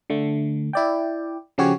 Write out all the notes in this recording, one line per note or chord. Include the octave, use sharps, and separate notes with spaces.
D3 A3
E4 D5 G5
C#3 F3 C#4 F#4 G4 C#5